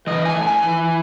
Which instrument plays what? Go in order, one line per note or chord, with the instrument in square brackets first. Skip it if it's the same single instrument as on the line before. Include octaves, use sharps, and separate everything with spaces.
[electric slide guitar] E3 D#5
G#5
A2
G#5
E3